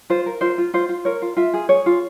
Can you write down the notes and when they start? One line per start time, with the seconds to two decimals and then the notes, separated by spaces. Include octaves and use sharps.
0.10 F4 C5
0.26 A#4
0.41 F4 C5
0.58 F4
0.74 F4 C5
0.89 F4
1.05 A#4 C#5
1.22 F4
1.37 F4 E5
1.54 G#4
1.69 G#4 C#5
1.86 F4